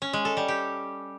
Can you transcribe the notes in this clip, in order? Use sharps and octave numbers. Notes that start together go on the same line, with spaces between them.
C#4
G#3
A4
G3
G4